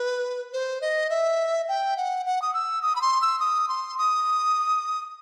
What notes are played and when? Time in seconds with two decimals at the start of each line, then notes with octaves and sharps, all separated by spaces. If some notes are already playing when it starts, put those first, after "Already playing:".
Already playing: B4
0.53 C5
0.81 D#5
1.10 E5
1.68 G5
1.97 F#5
2.26 F#5
2.42 D#6
2.54 E6
2.82 D#6
2.96 B5
3.02 C6
3.21 E6
3.40 D#6
3.69 C6
3.98 D#6